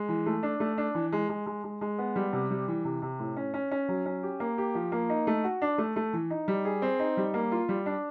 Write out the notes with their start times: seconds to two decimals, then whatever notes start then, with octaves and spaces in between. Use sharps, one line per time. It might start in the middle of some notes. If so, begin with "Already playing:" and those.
Already playing: G#3
0.09 E3
0.26 A3
0.43 D4
0.60 A3
0.78 D4
0.95 E3
1.12 G#3
1.29 G#3
1.46 G#3
1.64 G#3
1.81 G#3
1.98 B3
2.16 G3
2.33 C3
2.51 G3
2.68 E3
2.85 C3
3.02 C3
3.20 A2
3.37 C#4
3.54 C#4
3.71 C#4
3.89 F#3
4.06 C#4
4.23 G4
4.40 A#3
4.58 G4
4.75 F3
4.92 A#3
5.10 D#4
5.27 A3
5.44 F#4
5.62 D4
5.78 A3
5.96 A3
6.13 E3
6.30 D#4
6.48 G3
6.65 G#4
6.82 C4
6.99 D#4
7.17 G3
7.34 A#3
7.52 F4
7.69 G3
7.86 D4